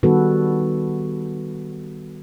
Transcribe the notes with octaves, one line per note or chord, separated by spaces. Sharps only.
D#3 G3 B3 F#4 A4 B4